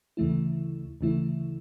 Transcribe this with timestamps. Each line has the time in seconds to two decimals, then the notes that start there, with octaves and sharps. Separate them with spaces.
0.17 D2 C#3 E3 A3 E4
1.01 D2 C#3 E3 A3 E4